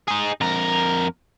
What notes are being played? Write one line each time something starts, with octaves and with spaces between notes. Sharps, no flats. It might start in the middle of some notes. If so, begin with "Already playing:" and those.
D#4 G#4
F2 A#4